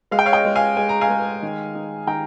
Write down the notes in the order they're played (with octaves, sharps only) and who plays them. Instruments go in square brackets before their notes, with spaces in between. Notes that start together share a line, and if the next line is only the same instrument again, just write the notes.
[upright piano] G#3 F5
G5
C#5 F5
D#5 G5
G#3
F5 G#5
G#3 G#5
A#5
F5 G#5
G#3
D#3
D#4
D#3 G5 A#5